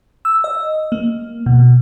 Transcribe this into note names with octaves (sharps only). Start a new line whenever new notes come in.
E6
D#5
A#3
B2